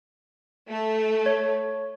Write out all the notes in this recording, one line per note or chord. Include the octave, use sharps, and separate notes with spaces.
A3
C#5